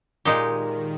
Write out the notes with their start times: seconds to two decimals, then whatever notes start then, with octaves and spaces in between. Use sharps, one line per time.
0.25 A#2 D#3 G#3 D#4 G4